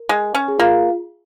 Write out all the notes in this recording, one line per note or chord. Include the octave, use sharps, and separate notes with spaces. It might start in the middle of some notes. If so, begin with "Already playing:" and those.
Already playing: A#4
G#3
C#4
G#4
A#3 F4